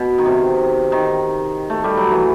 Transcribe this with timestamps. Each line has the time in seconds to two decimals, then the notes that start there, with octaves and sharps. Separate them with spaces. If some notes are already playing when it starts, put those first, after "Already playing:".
Already playing: B2
0.18 D#3
0.26 C3
0.92 D#3
1.70 A3
1.84 G3
1.97 F#3
2.12 E3